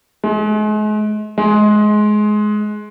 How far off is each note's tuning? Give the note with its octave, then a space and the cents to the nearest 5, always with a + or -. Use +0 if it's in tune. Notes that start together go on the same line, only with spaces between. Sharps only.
G#3 +40
G#3 +20